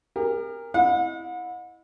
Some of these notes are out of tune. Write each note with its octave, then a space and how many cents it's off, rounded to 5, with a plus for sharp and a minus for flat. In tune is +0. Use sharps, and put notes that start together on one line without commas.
G4 +45 A#4 +0
E4 +0 D#5 +0 F#5 -40